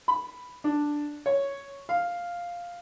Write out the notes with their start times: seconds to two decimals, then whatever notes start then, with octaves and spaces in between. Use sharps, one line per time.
0.08 B5
0.64 D4
1.26 C#5
1.89 F5